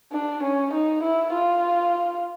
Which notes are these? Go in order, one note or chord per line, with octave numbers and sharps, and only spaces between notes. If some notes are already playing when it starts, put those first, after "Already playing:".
D4
C#4
D#4
E4
F4